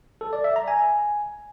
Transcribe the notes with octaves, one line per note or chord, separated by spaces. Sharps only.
A4
D5
E5
A#5
G#5